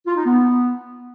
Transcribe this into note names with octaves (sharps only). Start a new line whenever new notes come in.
F4
D#4
B3